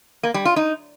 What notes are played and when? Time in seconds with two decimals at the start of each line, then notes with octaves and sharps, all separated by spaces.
0.23 A#3
0.34 G3
0.45 F4
0.56 D#4